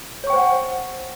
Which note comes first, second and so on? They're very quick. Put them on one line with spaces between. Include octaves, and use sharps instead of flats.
C#5 C#6 G5 C5 F#5